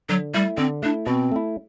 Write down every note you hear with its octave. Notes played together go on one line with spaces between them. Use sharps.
D3 F#3
G3 A3 E4
D3 C4
A3 D4 E4
B2 C4
A3 E4